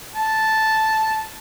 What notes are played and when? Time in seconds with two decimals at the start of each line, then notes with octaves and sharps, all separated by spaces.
0.15 A5